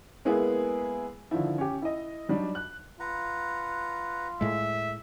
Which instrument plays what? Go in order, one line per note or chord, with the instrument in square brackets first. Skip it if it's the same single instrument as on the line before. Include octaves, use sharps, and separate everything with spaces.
[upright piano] G#3 A#3 B3 E4 G#4
D3 D#3 F3 E4
C#4 G4
E4 D#5
F#3 G3 D4 D#4
F#6
[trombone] F4 [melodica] B4 F#5 A#5
[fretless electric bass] A2 G#3 [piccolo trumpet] E5